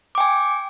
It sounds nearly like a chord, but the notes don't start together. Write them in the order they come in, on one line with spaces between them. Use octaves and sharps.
D6 G5 G#5